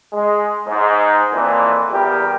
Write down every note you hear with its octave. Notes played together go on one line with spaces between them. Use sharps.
G#3
G#2
F2 A#2 E3
E2 G3 G4 A#4